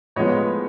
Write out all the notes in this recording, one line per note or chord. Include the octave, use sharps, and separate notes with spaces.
A2 F3 G#3 B3 C#5 D#5